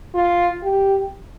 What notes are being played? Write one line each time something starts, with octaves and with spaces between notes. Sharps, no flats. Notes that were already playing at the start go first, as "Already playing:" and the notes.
F4
G4